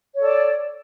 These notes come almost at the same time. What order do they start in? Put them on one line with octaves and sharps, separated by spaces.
C#5 A4 D5